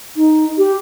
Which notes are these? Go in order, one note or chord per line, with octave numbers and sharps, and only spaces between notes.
D#4
G4